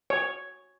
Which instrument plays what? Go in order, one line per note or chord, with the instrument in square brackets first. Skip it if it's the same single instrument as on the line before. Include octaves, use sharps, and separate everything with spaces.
[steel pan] C#5